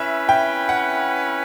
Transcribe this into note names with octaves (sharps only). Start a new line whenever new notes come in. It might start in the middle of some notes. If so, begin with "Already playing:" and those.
Already playing: C#4 E4 B4 E5
G5
F#5